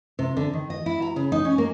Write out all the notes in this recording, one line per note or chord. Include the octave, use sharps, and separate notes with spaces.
C3
D3
D#3
D#5
E4
A#5
C#3
D#4
C#4
A#3